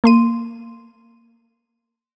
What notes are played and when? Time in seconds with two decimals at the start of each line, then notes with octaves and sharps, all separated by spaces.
0.04 A#3 C6 D#7